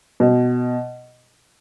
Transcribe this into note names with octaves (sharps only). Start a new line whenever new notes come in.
B2